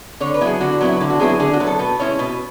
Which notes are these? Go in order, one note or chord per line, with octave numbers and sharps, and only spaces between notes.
D3 C#5
B4
F#3 B3 E4
G#4
D3 F#4
F#3 B3 E4
D3 E4
F#4
F#3 B3 E4 G#4
G#4
D3 G#4
F#4
F#3 B3 E4
A4
B2 B4
G#3 C#4 E4 C#5
B2 B4